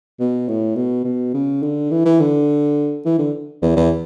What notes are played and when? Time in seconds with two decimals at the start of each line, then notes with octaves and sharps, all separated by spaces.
0.20 B2
0.48 A2
0.76 B2
1.05 B2
1.34 C#3
1.63 D3
1.91 E3
2.05 E3
2.20 D3
3.05 E3
3.19 D3
3.62 E2
3.77 E2